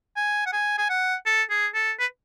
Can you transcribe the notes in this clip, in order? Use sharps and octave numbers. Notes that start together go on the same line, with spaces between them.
G#5
F#5
G#5
G#5
F#5
A4
G#4
A4
B4